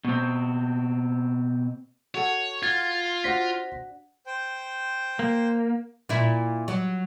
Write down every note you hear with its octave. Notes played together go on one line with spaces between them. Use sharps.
B2 C4
F#4 A4 C#5 F#5
F4 G#6 A6
D4 F#4 C5 A#6 B6
C5 G5
A#3
A#2 E4
F#3